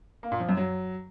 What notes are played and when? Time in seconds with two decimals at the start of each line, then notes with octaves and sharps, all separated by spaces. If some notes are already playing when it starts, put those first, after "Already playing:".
0.23 A#3
0.32 A#2
0.40 F3
0.49 F#2
0.57 F#3